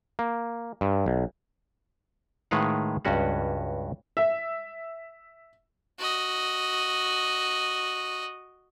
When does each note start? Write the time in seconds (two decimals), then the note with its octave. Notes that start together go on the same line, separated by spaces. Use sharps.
0.19 A#3
0.81 G2
1.06 B1
2.51 A2 D#3 G#3 B4 F5 F#5
3.05 C#2 G2 C#4 F#4 F#5
4.17 E5
5.99 F#4 D#5